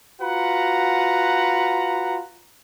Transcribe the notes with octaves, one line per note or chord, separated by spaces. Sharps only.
F4 F#4 B4 F#5 A#5